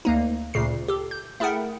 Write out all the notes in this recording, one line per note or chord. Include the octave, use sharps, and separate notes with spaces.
D2 A#3 D#4
D2 A#2 C#3 C7
G4 A4
G6
A3 E4 G#4 A#4 F#5 G5